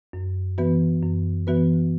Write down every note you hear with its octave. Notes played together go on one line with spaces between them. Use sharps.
F#2
E3 B3 F#4 B4
F#2
E3 B3 F#4 B4